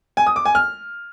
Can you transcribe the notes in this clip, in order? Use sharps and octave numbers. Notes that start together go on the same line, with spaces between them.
G#5
D#6
D6
G#5
F6